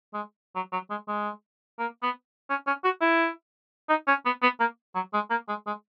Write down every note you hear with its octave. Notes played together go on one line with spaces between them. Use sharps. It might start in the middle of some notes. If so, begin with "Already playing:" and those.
G#3
F#3
F#3
G#3
G#3
A#3
B3
C#4
C#4
F#4
E4
D#4
C#4
B3
B3
A#3
F#3
G#3
A#3
G#3
G#3